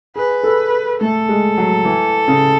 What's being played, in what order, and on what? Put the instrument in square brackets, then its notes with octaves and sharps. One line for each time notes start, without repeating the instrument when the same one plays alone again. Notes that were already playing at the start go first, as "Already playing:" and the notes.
[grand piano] G#4 [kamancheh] B4
[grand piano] A4
[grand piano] A3 [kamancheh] A4
[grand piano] G#3
F#3
E3
C#3